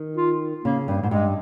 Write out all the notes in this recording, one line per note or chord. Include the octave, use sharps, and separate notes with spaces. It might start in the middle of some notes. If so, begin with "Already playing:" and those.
Already playing: D#3
F4
C#3 A#3
G2
G#2
G2 G#3